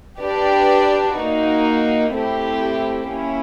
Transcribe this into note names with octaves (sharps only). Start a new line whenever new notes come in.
D4 G4 B4 D5
A#3 D#4 F#4
A3 C4 E4 G4
A#3 C#4 E4